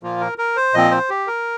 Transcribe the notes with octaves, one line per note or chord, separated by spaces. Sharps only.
A#2 F3 A#3 F4
A#4
A#4
C5
A#2 F3 C4 D#5
C5
G4
A#4